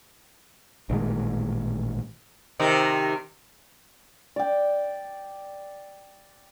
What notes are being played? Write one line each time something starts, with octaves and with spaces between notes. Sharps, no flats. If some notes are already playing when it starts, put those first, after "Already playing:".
A1 A#2 D#3 G#3
C3 D#3 D#4
D5 G5